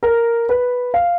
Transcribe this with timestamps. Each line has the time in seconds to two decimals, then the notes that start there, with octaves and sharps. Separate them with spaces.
0.03 A#4
0.49 B4
0.94 F5